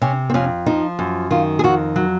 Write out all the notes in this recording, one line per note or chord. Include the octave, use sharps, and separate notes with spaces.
C3 C#4
C4
F2 C#4
F3 D#4
F#2
D#3 F4
G#4
F2 F#4
F#3